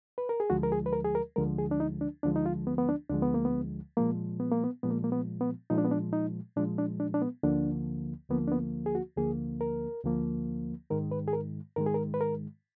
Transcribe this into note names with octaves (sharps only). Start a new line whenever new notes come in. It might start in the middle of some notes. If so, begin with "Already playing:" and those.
B4
A#4
G#4
D2 D3 F3 G#3 F#4
A#4
G#4
B4
A#4
G#4
A#4
D2 D3 F3 G#3 A#4
G#4
D4
D#4
D4
D2 D3 F3 G#3 D4
D#4
F4
B3
B3
D4
D2 D3 F3 G#3 D4
B3
A#3
B3
A#2 F3 G#3 A#3
B3
A#3
B3
A#2 F3 G#3 B3
A#3
A#3
B3
B3
A#2 F3 G#3 D#4
D4
B3
D4
D#4
A#2 F3 G#3 D4
D4
D4
D4
B3
D2 D3 F3 A#3 D4
D2 D3 F3 A#3 B3
D4
B3
G#4
F#4
D2 D3 F3 A#3 G#4
A#4
D2 D3 F3 A#3
G#2 D#3 G#3 A#4
B4
G#4
A#4
G#2 D#3 G#3 A#4
G#4
A#4
B4
A#4